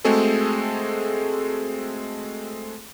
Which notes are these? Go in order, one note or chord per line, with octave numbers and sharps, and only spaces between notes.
G#3 A3 C4 F#4 G#4 A4